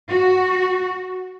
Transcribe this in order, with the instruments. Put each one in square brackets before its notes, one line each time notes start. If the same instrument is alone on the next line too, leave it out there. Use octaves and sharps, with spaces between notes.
[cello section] F#4